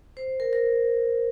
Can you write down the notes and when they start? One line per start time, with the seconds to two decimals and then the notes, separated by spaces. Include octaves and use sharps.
0.17 C5
0.40 A#4
0.53 A#4